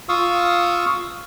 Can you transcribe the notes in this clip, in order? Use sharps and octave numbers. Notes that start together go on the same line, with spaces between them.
F4 F5 C#6 D#6 E6